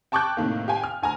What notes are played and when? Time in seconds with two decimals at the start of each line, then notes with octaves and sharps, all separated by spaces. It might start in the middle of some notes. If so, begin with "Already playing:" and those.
0.12 G5 A5 C#6 D6 F#6 G6
0.37 A2 C3 D#3 A#3
0.68 G4 F5 G5 G#5
0.84 F6
1.02 D2 G#5 A#5 F6